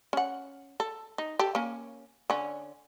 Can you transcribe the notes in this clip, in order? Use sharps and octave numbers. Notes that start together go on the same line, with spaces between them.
C#4 F#5
A4
D#4
G4 A4
A#3 C#4
D3 C#4